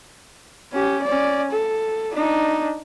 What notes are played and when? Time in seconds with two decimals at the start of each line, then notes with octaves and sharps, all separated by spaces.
0.72 C#4 G4
1.03 C#4 D5
1.52 A4
2.14 D4 D#4